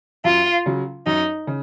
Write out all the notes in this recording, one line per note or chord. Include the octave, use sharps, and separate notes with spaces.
F#2 F4
C#3 F#3
F#2 D#4
C#3